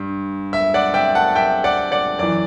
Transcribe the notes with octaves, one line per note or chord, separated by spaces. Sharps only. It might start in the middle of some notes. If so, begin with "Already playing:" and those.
Already playing: G2
E5
D5 F#5
E5 G5
F#5 A5
E5 G5
D5 F#5
D5 F#5
F#2 E3 D5